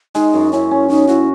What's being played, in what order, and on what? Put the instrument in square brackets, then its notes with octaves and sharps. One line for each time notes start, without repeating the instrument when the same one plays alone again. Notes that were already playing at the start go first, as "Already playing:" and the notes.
[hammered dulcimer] G#3 [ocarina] D#4
[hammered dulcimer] F#2
[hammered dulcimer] C#4 [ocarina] E4
[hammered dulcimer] C#4
[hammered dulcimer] C#4 [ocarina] D#4
[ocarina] E4 [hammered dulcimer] F#4